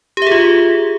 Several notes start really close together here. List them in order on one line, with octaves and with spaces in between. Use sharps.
G4 E5 G#4 F4